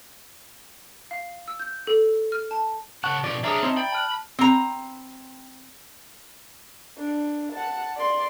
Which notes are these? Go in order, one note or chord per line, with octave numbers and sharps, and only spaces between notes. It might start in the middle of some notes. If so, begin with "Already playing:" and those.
F5
E6
G6
A4
F6
A5
C#3 F#5 A5 C#6
B2 F3 D5 D6
C#4 D4 G#4 B4 E5 A#5 D6
C4 D#4 A5
D5 G5 B5
A5 F6 F#6
C4 A#5
D4
F#5 A5
D5 C6